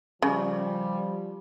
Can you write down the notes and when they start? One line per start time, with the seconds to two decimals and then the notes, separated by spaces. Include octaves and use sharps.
0.22 C#3 F3 G3